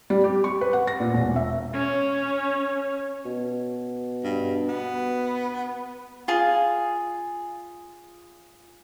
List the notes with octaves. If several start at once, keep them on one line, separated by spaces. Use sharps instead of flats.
G3
G4
C#6
B4
F#5
A#6
A#2
E1
E5
C#4 C#5
B2
G2
B3
F4 G#4